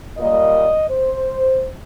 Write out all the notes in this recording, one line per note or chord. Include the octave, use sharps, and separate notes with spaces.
A#2 G3 A#3 D#5
C5